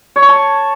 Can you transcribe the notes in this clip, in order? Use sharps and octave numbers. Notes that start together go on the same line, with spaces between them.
C#5
C#6
A5